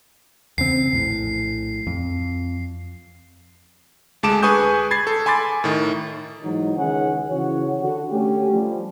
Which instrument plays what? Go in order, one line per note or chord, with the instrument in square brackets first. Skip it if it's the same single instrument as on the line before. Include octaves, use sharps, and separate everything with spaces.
[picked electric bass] E2 C#3 C4 [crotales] C7
[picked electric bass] A#1 A2
F2
[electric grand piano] D2 G#3 A5 D6 D7 E7
G#4 B4 G#5 C#6 D#6 G6
B5 G#6 A6 C7
A4
G#5 B5 C6 D6 A6
A2 D#3
[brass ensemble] G#2 E3 F#3 D#4
C#2 D#3 G#3 C#4 G#4 F#5
C#3 E3 F3 F#4 C#5
D3 F#4
A3 C#4 G4
F3 G3